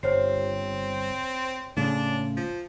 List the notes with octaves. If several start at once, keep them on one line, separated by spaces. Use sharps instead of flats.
G1 C4 C5 C#5 C7
A2 C#3 G#3 D4
F3